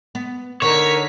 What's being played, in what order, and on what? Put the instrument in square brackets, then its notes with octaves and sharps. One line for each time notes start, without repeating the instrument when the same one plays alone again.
[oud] B3
[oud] D3 [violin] D#4 B6 [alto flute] A#4 [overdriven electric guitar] C#5